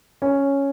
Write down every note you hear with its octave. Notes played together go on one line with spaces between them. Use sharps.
C#4